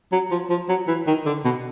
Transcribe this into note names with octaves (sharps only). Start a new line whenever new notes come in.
F#3
F3
F3
F#3
E3
D#3
D3
B2